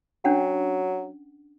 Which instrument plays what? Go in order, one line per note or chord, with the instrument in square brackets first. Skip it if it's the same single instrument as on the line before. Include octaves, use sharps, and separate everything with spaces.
[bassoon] F#3 [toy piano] C#4 D4 F#5